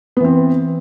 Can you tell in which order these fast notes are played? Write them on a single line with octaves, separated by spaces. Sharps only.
B3 E3 C4